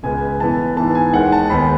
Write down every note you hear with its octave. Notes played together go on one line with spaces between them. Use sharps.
C#2 B2 G#3 B3 G#5
A2 E3 B3 A5
G#2 E3 B3 A5
G#5
D#2 D#3 G#3 F#5
A5
D#2 D#3 G#3 B3 B5